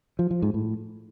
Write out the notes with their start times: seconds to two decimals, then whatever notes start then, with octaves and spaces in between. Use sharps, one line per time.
0.19 F3
0.31 F3
0.42 G#2
0.54 A2